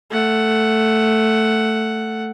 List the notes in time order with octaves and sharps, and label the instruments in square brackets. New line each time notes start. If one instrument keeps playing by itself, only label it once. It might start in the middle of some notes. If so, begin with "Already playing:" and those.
[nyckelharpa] A3 F#5